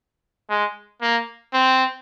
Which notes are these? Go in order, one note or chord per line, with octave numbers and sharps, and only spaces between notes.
G#3
A#3
C4